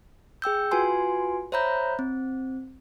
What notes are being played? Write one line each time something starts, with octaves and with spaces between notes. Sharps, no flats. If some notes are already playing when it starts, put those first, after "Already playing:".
G#4 G5 E6 G6
F4 F#4 B4 G#5 C6
C5 C#5 E5 A#5 B5 G6
C4